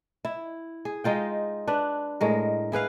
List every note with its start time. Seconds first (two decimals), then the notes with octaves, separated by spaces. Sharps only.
0.25 E4
0.85 G#4
1.04 G#3 D#4 F4 G5
1.67 D4 B4
2.21 A2 G#3 A#4
2.72 E4 G#4 B4 F5